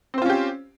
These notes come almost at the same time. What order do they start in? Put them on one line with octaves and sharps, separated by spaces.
C4 C5 F4 C#4 G4